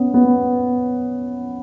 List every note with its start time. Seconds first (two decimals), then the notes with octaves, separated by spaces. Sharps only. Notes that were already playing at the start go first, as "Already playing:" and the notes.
Already playing: B3 C#4
0.14 B3